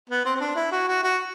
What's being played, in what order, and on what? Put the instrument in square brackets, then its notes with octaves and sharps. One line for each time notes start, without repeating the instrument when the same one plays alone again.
[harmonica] B3
C4
C4
D4
E4
F#4
F#4
F#4